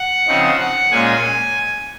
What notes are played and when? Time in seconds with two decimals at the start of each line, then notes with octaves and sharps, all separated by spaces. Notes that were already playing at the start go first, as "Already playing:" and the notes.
Already playing: F#5
0.27 C#3 F3 C4 D#4
0.60 F#5
0.92 A#2 G#3 C#4 G#5